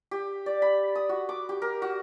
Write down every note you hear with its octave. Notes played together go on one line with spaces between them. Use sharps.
G4
D5
B5
D#6
F#4
D6
G4
A#4
F#4